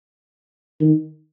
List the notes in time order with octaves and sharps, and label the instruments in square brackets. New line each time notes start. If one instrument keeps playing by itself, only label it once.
[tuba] D#3